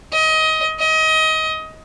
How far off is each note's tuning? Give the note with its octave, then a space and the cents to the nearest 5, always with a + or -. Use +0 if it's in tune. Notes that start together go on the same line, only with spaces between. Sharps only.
D#5 +25
D#5 +25